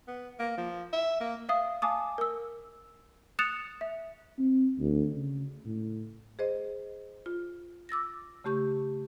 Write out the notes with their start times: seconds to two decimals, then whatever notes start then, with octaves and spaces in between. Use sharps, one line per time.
0.07 B3
0.39 A#3
0.57 F3
0.93 E5
1.21 A#3
1.49 E5 F5 D#6
1.82 F5 G#5 A5 D6 D#6
2.18 A#4 E6
3.39 D#6 F#6 A6 C#7 E7 F7
3.81 E5
4.39 C4
4.79 D2
5.13 C#3
5.65 A2
6.39 G#4 C5 D#5
7.26 F4
7.89 D6 E6 A6 A#6
8.44 C#3 A3 G4 C#6 G6